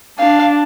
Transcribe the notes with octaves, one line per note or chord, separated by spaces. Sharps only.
D4 F5